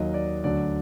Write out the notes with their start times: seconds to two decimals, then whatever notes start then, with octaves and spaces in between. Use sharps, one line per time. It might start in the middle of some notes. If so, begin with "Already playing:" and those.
Already playing: D#2 D#3 F#3 D#5
0.14 D5
0.44 D2 D3 F#3 D5